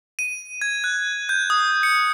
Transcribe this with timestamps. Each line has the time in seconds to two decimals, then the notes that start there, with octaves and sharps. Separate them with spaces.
0.19 D#7
0.61 G#6
0.84 F#6
1.29 G6
1.50 D#6
1.83 C#7